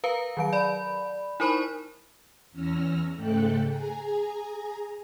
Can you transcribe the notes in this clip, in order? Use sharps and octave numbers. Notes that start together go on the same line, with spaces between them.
A#4 B4 F5 A#5
D#3 F#3 D7
D5 B5
D#4 E4 A#4 C5 B5 C#6
E2 C#4 E6 F6 A#6
G#2 C#3 A3 A4 G5 F#6
G#4 G#5 A#5